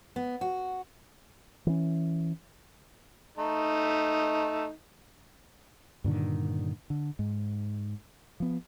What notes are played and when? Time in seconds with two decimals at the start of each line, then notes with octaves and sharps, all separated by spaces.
0.16 B3
0.41 F#4
1.67 E3 C#4
3.38 A3 D#4
6.04 G2 A#2 D3 D#3
6.90 D3
7.19 G#2
8.40 F3 B3